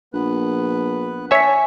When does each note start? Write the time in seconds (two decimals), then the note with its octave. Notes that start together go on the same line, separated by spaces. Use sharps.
0.14 A#1 B3 B4 F#6
1.31 C#5 E5 G#5 A5 C#6 B6